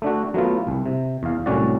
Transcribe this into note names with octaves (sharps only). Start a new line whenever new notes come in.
A3 D4 F#4
F#3 A3 B3 F4
C2
C3
E2 F5
C2 A2 F#3 C#4 F#4 D5